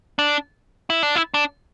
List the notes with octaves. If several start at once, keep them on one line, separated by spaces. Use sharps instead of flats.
D4
E4
D4
E4
D4